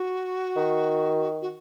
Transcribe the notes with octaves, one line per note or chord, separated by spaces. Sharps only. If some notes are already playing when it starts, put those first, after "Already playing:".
Already playing: F#4
D#3
F#4